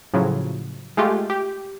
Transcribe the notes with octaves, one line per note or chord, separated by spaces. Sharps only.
A2 C#3 F3 F#3
G#3 A3 F4 G4
G4